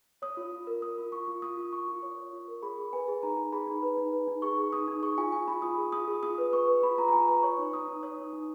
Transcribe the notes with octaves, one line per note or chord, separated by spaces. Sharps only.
C#5 D#6
F4
F4
A#4
A#4 D#6
F4
F4 C#6
F4
F4 D#6
F4
F4 C#6
F4
C#5
C#5
F4
A#4
G#4 B5
G#4
B4 G#5
G#4
D#4 A#5
D#4
G#4 B5
D#4
B4
D#4
B4
D#4
G#4 C#6
G#4
D#4 D#6
D#4
G#4 C#6
F4 G#5
F4 G#5
F4 B5
F4 D#6
G#4
F4 D#6
G#4
F4 D#6
B4
B4 C#6
B4
F4 B5
F4 A#5
A#5
F4 G#5
B4 A#5
C#5 C#6
D#4
C#5 D#6
D#4
C#5 D#6
D#4
D#4